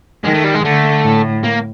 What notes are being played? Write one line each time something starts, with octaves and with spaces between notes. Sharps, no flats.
D#3 G#3
A3
G3
G#3
D3 A3
A2
A#3